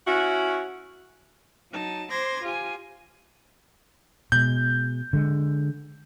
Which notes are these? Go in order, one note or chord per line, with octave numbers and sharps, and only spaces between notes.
C#4 E4 F#4
F#3 D#4 A5
C5 C6 D6 G#6 A#6
F4 G4 G#5
B2 G#3 G6
D3 G#3